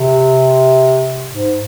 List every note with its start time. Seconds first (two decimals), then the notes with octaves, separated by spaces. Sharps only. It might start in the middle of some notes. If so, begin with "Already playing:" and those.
Already playing: C3
1.30 G#2